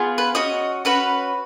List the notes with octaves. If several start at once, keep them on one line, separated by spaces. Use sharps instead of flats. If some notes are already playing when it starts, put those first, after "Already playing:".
Already playing: B3 F4 G#4
B4
C#4 F#4 D#5
C#4 F#4 B4